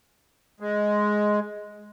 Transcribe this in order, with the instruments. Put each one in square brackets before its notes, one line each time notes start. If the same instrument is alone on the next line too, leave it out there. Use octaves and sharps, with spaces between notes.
[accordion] G#3